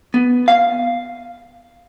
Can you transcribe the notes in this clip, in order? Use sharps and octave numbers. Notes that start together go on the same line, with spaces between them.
B3
F5